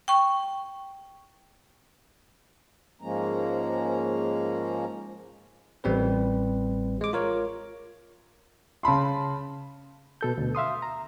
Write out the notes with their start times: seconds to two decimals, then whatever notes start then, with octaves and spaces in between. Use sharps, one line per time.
0.08 G5 C#6
3.01 G#2 F3 G#3 A#3 C#4 A#5
5.84 A1 G3 C4 B4
7.01 G#3 D6
7.13 F4 A#4 C#5
8.83 C#3 A5 B5 C6
10.21 B2 A4 G6
10.38 D2 B2
10.55 E5 F5 C6 D#6
10.82 A#5